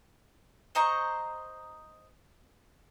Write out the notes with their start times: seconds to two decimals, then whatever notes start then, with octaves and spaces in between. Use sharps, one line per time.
0.75 C5 D#5 A#5 C#6